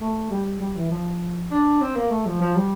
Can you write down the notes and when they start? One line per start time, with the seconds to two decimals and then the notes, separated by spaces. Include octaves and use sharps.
0.01 A3
0.31 G3
0.60 G3
0.76 E3
0.90 F3
1.51 D4
1.81 C4
1.96 A#3
2.11 A3
2.26 F3
2.41 F3
2.56 G3